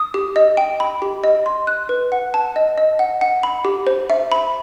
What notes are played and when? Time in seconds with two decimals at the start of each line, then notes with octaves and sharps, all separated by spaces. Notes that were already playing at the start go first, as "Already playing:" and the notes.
Already playing: D#6
0.14 G4
0.36 D#5
0.57 G5
0.80 B5
1.02 G4
1.24 D#5
1.46 C6
1.67 F#6
1.89 B4
2.12 F#5
2.34 A5
2.56 D#5
2.78 D#5
2.99 F#5
3.21 F#5
3.43 B5
3.65 G4
3.87 C5
4.10 E5
4.32 B5